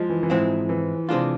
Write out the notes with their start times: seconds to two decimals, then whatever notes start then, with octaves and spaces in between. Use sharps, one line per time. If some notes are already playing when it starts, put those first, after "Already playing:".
Already playing: F3 G#3
0.10 E3
0.23 E3
0.30 G#2 F3 G#3 C4 E4
0.69 E3
1.09 C3 G#3 D4 F4